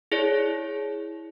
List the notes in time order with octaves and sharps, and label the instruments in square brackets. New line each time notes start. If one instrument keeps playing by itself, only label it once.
[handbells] E4 G#4 C#5 D5